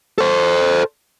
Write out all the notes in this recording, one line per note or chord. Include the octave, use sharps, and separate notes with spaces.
A4 C5